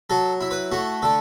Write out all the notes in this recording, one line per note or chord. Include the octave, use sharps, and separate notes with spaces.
F#3 A4
E4
B4
A3 F#4
D3 A4